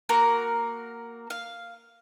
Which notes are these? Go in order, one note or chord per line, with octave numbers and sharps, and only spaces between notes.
A#3 F#4 A#4
F5